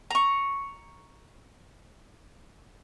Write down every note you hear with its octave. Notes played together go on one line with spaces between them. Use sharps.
A#5 C#6